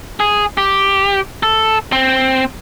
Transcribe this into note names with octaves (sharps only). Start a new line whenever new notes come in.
G#4
G4
A4
C4